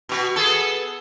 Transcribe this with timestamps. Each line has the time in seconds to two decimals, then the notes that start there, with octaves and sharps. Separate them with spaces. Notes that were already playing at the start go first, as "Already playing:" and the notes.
0.09 B2 F#4
0.36 B3 G#4 A4